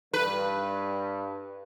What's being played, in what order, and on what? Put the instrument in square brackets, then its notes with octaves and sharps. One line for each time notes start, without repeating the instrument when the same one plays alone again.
[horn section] G2 [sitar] B4